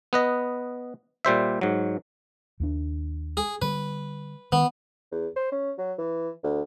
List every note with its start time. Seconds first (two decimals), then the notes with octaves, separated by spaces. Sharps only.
0.13 B3 B4 D#5
1.25 A#2 G3 C5 E5
1.61 G#2 F#3
2.60 D#2 A#3 D4
3.37 G#4
3.62 D3 G3 B4
4.52 D#3 B3
5.12 E2
5.36 C5
5.52 C#4
5.78 F#3
5.98 E3
6.44 D2